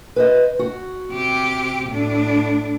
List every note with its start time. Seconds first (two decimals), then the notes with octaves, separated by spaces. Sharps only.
0.16 B4 C5 D#5
0.59 F#4
1.12 C3 G4
1.89 A2 D4